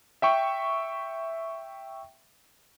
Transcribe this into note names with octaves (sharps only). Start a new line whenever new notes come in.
E5 G5 C#6